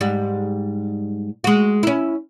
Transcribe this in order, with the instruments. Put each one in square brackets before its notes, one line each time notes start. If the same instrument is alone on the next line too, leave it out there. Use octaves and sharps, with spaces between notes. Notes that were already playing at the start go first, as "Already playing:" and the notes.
[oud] G#2 G3
G#3 F#4
C#4 E4